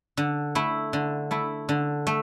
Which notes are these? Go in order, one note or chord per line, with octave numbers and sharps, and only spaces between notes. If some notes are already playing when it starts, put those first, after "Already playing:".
D3
A3 E4
D3
A3 E4
D3
A3